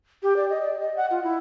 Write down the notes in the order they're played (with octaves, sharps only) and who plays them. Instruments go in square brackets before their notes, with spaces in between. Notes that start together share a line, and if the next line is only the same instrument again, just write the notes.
[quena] G4
D5
D#5
D5
D#5
F#5
F4
E4